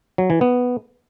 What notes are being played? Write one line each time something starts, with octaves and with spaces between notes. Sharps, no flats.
F#3
E3
B3